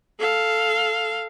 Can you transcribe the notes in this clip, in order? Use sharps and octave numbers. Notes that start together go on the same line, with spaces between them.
A4 F5